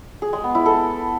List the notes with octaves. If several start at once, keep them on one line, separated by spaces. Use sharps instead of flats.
G#4
G#3
B3
E4
A4